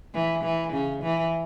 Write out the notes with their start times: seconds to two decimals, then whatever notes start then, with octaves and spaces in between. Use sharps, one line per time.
0.14 E3
0.43 E3
0.73 C#3
1.03 E3